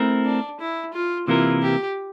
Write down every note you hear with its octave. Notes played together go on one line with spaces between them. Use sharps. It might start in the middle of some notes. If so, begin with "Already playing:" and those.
Already playing: A3 C4 E4 A#4
D4
E4
F4
C3 E3 A#3 E4 F4 A#4
G4